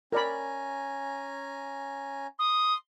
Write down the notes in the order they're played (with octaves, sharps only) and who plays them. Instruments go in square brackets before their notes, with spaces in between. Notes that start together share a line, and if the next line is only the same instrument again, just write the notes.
[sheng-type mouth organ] C#4 G#5 A#5 [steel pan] A#4 D5 B5
[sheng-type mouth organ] C6 [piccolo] D#6